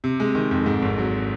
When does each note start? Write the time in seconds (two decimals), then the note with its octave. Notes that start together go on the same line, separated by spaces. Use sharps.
0.04 C3
0.20 G#3
0.35 D#3
0.51 F2
0.66 G#2
0.82 G#1
0.98 F#3